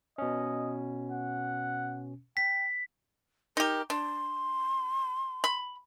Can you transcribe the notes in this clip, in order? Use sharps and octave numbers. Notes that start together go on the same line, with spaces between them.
B2 C#4 D#5
F#5
G5 B6
D#4 G4 A#4
D4 C6
B5